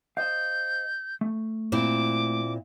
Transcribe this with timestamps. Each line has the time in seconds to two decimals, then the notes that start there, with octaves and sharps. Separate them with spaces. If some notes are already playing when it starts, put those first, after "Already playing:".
0.17 C5 D#5 F5 G6
1.21 A3
1.72 A#2 C4 E4 D6